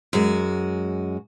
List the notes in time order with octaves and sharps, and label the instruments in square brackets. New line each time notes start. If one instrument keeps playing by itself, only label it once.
[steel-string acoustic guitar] F#2 G#3 F#4